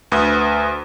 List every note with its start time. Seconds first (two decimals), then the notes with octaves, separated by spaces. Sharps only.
0.12 D2 B4 D#6